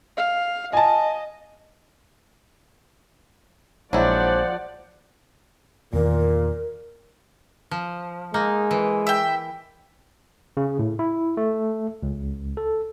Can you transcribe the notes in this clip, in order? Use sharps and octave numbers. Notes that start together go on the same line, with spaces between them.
F5
D#5 G#5 A5
A#1 F3 F#3 G#3 E4 C5 D5 F#5
E2 A#2 D#3 A#4
F3
G#3 A#3 D#4
E3
E5 G5
C#3
A2
E4
A3
C#2
A4